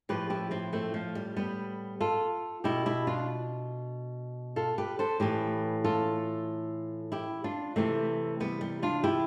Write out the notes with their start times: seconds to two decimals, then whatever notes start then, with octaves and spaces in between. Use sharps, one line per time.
0.09 A2 F3 G4 B4
0.30 E4 G4
0.51 C4 E4
0.73 A3 C4
0.94 F3
1.15 G3
1.36 G3 B3
2.00 F4 A4
2.64 B2 E4 G4
2.86 E4 G4
3.07 D4 F4
4.56 F4 A4
4.78 G4 B4
4.99 A4 C5
5.20 A2 E3 G4 B4
5.84 F4 A4
7.12 E4 G4
7.44 D4 F4
7.76 C3 E3 A3 C4
8.40 G3 B3
8.61 G3
8.82 D4 F4
9.04 E4 G4